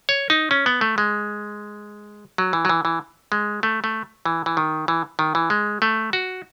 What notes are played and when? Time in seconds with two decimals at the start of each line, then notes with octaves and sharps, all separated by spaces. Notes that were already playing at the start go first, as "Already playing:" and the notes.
0.09 C#5
0.30 D#4
0.51 C#4
0.66 B3
0.81 A3
0.98 G#3
2.38 F#3
2.53 E3
2.65 F#3
2.69 E3
2.85 E3
3.32 G#3
3.63 A3
3.84 A3
4.26 E3
4.46 E3
4.57 D#3
4.88 E3
5.19 D#3
5.35 E3
5.50 G#3
5.82 A3
6.13 F#4